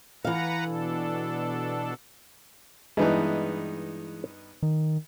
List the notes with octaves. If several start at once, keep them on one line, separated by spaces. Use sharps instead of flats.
E3 B4 F5 F#5 A#5
B2 D4 A4
G2 E3 G#3 B3 D#4
D#3